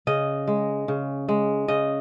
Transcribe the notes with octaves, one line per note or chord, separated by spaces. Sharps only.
C#3 D#5
G#3
C#3
G#3
C#3 D#5